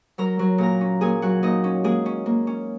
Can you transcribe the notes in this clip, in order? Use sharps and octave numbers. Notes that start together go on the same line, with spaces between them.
F#3 A#4 A#5
F#3
A#2 A#4 A#5
C#4
A#2 G#4 G#5
F#3 F#4 F#5
A#2 D#4 D#5
C#4
G#3 A#3 G#4
C#4
A#3
C#4